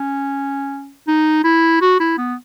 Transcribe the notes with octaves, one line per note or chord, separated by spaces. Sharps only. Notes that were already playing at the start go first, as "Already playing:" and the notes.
Already playing: C#4
D#4
E4
F#4
E4
B3